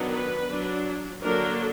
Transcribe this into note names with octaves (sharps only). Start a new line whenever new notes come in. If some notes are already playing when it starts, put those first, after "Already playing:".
Already playing: D#3 F#3 B3 D4
B4
F#3 D4
D3 F#3 A#3 D4 A#4